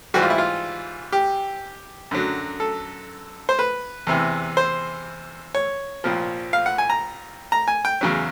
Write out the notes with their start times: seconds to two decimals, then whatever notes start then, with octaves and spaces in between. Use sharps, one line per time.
0.14 G#2 E3 G3 F#4
0.22 F4
0.30 E4
0.38 F4
1.12 G4
2.11 F#2 D3 F#3
2.60 A4
3.49 C5
3.59 B4
4.07 E2 C3 E3
4.57 C5
5.55 C#5
6.04 C2 A#2 F3
6.53 F5
6.66 F#5
6.78 G#5
6.90 A#5
7.52 A#5
7.68 G#5
7.85 G5
8.01 E2 C#3 F#3